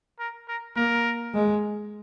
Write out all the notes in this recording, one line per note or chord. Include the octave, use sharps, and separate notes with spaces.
A#4
A#4
A#3 A#4
G#3